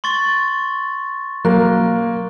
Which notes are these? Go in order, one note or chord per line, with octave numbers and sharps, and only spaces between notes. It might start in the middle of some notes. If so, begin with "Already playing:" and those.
C6 C#6 A6
F#3 A#3 F#6